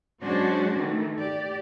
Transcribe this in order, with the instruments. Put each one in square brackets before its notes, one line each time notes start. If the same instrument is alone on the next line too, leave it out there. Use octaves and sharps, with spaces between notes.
[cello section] F#3 G#3 C#4 D4 F#4 C5
D#3 E3 A3
G4 D5